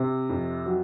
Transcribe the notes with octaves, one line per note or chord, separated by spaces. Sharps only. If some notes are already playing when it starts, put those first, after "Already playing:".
Already playing: C3
F2
F#3